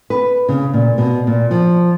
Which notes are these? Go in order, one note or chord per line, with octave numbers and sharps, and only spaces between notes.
B4
C#3
A#2
B2
A#2
F3